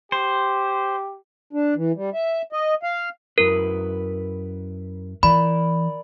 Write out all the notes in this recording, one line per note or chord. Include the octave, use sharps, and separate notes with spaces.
G4 C5
D4
E3
G3
E5
D#5
F5
F#2 E4 A#4 B4
E3 A#4 D5 B5